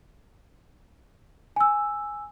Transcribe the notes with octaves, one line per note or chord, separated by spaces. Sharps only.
G#5 E6